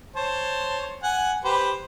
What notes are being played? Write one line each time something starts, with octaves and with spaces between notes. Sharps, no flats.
C5 C#5 A5
F#5 G#5
G4 B4 C5